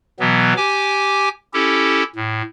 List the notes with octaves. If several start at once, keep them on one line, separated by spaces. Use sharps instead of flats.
B2 E3 F#3 B3
G4 G#5 D6
C#4 E4 G4 A4
A2